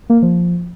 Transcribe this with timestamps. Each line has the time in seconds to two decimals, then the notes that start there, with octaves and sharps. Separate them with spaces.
0.10 A#3
0.22 F3